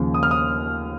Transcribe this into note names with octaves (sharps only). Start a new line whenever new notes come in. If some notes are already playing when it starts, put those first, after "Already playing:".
Already playing: D#2 C#3 F3 A#3
D#6
F6
D#6